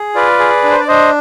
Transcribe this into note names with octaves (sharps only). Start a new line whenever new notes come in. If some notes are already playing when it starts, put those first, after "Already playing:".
Already playing: G#4
F4 B4 D5
G#4
D4
C5
D5
D4 C5 D#5